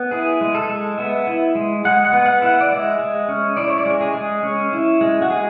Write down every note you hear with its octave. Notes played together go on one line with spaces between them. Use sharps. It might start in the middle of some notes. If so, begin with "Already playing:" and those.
Already playing: B3
E4 G#4
G#3
A4
G#3
B3 E5
E4
G#3
G#3 F#5
F#5
B3
F#5
E4 F#5
D5
G#3 E5
G#3
C#4
E4 D5
C#5
D5
G#3
G#4
G#3
C#4
E4
G#3
F#4
G#3 G#4